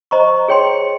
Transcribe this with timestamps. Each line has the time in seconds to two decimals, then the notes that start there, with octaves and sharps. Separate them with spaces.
0.11 C5 D#5 A#5 C#6
0.48 G#4 C#5 G5 C6